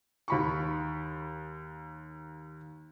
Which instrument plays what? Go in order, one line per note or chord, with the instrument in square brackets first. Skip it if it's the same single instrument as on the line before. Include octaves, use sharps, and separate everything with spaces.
[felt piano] D#2 B5 C#6